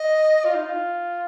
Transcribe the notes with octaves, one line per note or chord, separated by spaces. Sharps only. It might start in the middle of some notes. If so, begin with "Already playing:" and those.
Already playing: D#5
F4
D#4
F4